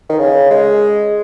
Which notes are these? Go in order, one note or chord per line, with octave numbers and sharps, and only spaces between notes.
D#3
C#3
G#3